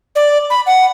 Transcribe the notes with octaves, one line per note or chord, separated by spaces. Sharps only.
D5
B5
F#5